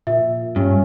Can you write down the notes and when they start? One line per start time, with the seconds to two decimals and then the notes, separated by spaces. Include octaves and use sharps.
0.07 A#2 E5
0.56 G2 C#4